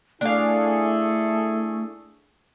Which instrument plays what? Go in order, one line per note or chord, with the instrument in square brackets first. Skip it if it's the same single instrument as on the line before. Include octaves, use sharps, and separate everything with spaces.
[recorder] A3 [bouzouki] D4 F5 [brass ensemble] E4 G#4 A4